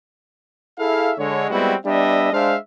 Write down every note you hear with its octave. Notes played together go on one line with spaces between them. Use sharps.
E4 G#4 A4 E5 F5
D3 G#3 C#5
G3 G#3 B3 C4 E4 F#4
G3 B3 D4 D#5 E5
G#3 D4 C5 E5 F5